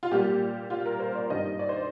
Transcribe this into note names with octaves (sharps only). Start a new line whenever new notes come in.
F4
A#2 G3 A#3 G4
F4
A#4
C5
D5
G2 D#3 G3 A#3 D#5
D5
C5